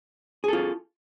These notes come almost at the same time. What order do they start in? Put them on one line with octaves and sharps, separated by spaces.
G#4 A4 F4